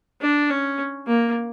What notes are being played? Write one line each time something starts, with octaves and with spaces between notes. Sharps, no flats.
D4
C#4
A#3